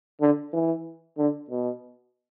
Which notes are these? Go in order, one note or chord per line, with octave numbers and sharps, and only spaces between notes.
D3
E3
D3
B2